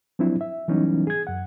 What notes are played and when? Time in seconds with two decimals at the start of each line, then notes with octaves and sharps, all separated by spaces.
0.19 F3 F#3 C4 D4 E4
0.41 E5
0.68 E3 F#3 G3 B3 C#4 D#4
1.07 G#4 G#6
1.27 F#2 F#5